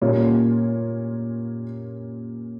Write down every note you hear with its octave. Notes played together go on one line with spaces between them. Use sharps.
A#2 G3 A#3 C#4 F4